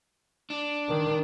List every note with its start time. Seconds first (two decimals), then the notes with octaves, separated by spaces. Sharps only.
0.50 D4
0.89 D#3